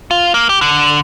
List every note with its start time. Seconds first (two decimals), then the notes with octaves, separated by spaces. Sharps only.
0.11 F4
0.34 A#3
0.49 G4
0.61 D3